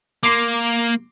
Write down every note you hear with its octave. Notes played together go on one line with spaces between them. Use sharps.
A#3 C6 D6